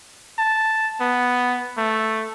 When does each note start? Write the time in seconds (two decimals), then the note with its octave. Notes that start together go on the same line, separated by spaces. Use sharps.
0.39 A5
1.01 B3
1.78 A3